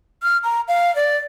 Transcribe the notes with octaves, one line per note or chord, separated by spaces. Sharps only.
F6
A#5
F5
D5